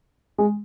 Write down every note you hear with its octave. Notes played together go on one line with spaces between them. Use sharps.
G#3